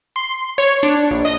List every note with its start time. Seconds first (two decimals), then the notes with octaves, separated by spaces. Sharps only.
0.16 C6
0.58 C#5
0.83 D4
1.11 A#1
1.25 D#5